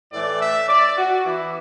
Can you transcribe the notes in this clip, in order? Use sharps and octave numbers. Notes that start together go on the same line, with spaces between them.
A2 E3 A3 D5
E5
D5
F#4
E3 B3 E4